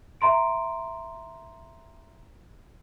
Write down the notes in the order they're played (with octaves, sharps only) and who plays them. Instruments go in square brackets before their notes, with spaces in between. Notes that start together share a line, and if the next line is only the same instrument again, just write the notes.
[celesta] E5 A#5 C6 D7